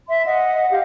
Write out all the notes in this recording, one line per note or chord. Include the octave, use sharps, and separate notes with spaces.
E5 C6
D#5 F#5
G4 F5